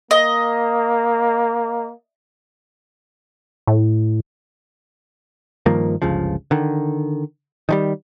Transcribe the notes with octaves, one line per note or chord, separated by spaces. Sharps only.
A#3 D#5
A2
G2 D#3 F3 A#3
G1 C#2 C#3 F3
D3 D#3
D#3 F3 G3